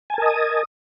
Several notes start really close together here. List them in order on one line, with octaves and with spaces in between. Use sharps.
G#5 A5 A#4 D#5 D#6